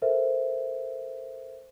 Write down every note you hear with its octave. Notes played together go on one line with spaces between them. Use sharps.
A4 A#4 C5 E5